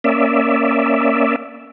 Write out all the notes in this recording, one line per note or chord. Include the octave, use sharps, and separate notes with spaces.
A#3 C#4 D5 E5